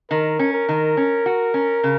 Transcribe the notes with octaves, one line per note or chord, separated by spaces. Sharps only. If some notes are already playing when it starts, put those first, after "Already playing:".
D#3 A#4
C#4
A#4
D#3
C#4
F#4
C#4
C#3